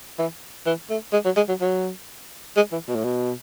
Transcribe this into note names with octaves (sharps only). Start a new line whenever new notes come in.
E3
E3
A3
G#3
F#3
G#3
F#3
F#3
G#3
E3
B2
A2
B2